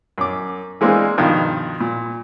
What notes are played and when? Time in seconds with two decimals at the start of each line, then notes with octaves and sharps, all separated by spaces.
0.18 F#2 D6
0.81 E3 G#3 A#3 C4 D4
1.18 G2 B2 D#3 F3
1.80 A#2